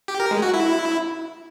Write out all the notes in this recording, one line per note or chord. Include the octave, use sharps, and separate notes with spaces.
G4
A#4
G#3
F#4
E4